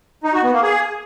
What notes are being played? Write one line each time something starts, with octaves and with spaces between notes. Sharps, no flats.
D#4
F#4
B3
A#3
G#4